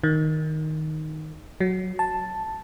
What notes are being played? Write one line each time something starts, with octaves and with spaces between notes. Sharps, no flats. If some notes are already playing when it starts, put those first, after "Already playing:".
D#3
F#3
A5